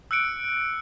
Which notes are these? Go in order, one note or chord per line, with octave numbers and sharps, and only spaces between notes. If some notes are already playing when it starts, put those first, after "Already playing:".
E6 F#6 C#7 D7